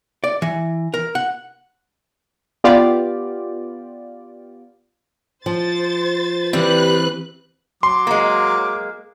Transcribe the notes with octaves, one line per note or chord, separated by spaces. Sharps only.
D5
E3
A#4
F#5
B3 F4 G4 D5
F3 C5 A6
E3 G3 C4 B4 F#6
F#3 C6 D6
G#3 A#3